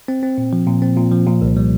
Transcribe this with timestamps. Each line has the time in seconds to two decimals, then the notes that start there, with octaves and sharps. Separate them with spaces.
0.08 C4
0.23 C4
0.38 A#2
0.53 F3
0.67 A#2
0.82 C4
0.97 A#2
1.12 F3
1.27 A#2
1.41 C2
1.57 G3